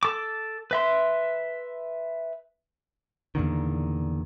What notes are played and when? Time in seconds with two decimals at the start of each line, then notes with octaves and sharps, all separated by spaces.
0.03 A4 D6
0.71 B4 E5 C6
3.35 E2 A#2 D3 D#3